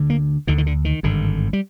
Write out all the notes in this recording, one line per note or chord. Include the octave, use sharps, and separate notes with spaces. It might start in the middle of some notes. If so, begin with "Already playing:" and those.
Already playing: D2 D3
A#3
D2 D3 D#3
D#3
D3
D#3
G#1 G2 D3
G3